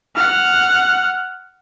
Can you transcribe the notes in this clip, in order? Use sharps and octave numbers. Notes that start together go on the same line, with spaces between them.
F#5 F6